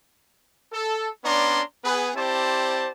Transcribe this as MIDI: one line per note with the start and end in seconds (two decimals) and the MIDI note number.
0.73 1.08 69
1.24 1.62 59
1.24 1.62 61
1.24 1.62 62
1.24 1.62 74
1.24 1.62 82
1.24 1.62 84
1.84 2.10 59
1.84 2.10 68
1.84 2.10 71
2.15 2.91 60
2.15 2.91 64
2.15 2.91 67
2.15 2.91 72
2.15 2.91 74
2.15 2.91 81